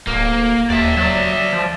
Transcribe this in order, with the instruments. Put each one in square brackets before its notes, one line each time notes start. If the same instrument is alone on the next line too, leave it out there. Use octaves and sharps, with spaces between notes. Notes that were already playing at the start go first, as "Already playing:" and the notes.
[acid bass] D1 [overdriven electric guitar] A#3
[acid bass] D#2 [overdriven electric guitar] D5 E5
[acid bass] F#3 [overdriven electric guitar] D5 E5
[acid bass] F3